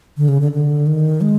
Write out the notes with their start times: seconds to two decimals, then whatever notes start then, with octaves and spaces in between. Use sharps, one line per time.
0.17 D3
0.28 C#3
0.41 D3
0.52 D3
0.87 D#3
1.21 G#3